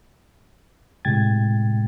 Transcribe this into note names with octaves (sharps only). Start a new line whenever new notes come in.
A2 C3 G#3 G5 G#6 A6